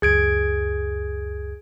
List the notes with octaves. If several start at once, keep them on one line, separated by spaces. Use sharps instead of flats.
C#2 F#2 G#4 G#6 D7